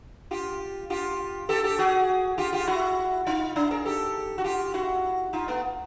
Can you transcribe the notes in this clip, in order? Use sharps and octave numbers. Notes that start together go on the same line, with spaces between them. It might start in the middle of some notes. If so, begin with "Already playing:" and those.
F4 G4
F4 G4
G4 A4
G4 A4
F#4 G#4
F4 G4
F4 G4
E4 F#4
D#4 F4
D4 E4
G#4 A#4
G4 A4
F#4
F4 G4
E4 F#4
D#4 F4
A3 B3